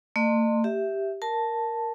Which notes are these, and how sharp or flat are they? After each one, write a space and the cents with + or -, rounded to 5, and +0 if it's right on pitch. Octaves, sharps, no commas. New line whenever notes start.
A3 +45 D#5 -40 C6 +0
G4 +0 E5 +0
A#4 +0 A5 +0